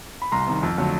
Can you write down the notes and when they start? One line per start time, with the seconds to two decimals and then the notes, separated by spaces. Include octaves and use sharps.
0.22 B5
0.32 C2 A#5 C6
0.48 C3 D#3
0.63 F2
0.78 D3 F#3 A3